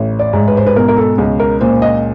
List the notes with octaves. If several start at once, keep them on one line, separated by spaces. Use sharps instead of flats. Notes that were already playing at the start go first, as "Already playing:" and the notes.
Already playing: A1
D5
G#2
B4
C5
B4
B2 A#4
A#4
A4
C#2
A#4
A#2 C5
D#5